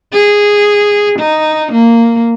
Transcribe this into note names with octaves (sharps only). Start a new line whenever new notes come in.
G#4
D#4
A#3